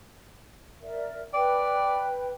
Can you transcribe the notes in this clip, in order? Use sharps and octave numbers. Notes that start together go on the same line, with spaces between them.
A#4 D5 E5
B4 D5 G5